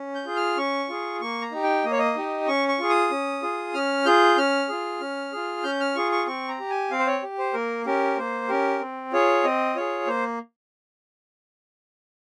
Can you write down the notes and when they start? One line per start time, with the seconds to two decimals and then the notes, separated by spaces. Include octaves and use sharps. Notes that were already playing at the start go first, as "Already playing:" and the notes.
Already playing: C#4
0.15 G6
0.26 F4 G#4
0.36 F6
0.57 C#4 C#6
0.89 F4 G#4
1.21 A#3 C#6
1.41 A#5
1.52 D#4 G4
1.63 G5
1.84 A#3 D#5
1.91 C#5
1.99 D#5
2.16 D#4 G4
2.47 C#4 C#6
2.68 C#6
2.79 F4 G#4
2.89 D#6
3.11 C#4
3.42 F4 G#4
3.74 C#4 F6
4.06 F4 G#4 G6
4.37 C#4 F6
4.69 F4 G#4
5.01 C#4
5.33 F4 G#4
5.64 C#4 G6
5.80 F6
5.96 F4 G#4 C#6
6.12 C#6
6.27 C4 C#6
6.49 A#5
6.59 G4
6.70 G#5
6.91 C4 F5
6.99 C5
7.07 C#5
7.23 G4
7.38 C5
7.54 A#3 A#4
7.86 C#4 G4 A#4
8.17 A#3 C5
8.49 C#4 G4 A#4
8.81 C4
9.13 F4 G#4 C#5
9.44 C4 D#5
9.76 F4 G#4 C#5
10.07 A#3 C5